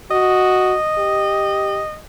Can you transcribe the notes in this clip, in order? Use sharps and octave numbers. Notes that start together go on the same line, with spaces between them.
F#4 D#5
G4